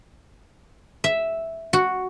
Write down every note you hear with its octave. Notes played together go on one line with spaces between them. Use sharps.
E5
F#4